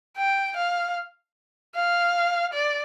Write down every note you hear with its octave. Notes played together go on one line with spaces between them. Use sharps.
G5
F5
F5
D5